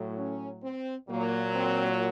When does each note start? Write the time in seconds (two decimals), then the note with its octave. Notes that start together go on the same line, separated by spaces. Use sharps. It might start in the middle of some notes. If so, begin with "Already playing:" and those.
Already playing: A2 F#3
0.17 C#4
0.63 C4
1.08 A#2 F#3 A#3
1.55 C4